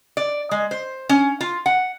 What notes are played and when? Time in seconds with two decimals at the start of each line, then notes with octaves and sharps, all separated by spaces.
0.17 D5
0.51 G#3
0.71 C5
1.09 C#4
1.41 F4
1.66 F#5